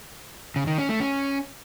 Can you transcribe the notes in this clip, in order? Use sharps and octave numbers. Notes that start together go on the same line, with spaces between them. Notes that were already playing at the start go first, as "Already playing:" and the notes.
C#3
D#3
C#4
A3
C#4